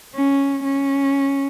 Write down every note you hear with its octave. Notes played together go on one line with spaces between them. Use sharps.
C#4
C#4